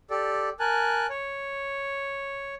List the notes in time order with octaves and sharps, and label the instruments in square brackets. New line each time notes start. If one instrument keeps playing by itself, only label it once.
[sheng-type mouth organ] G4 A4 D5
A#4 G#5 A5 F#6
C#5